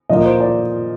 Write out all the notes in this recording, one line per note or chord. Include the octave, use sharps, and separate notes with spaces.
A#2 F3 A#3 D#5
C5
D5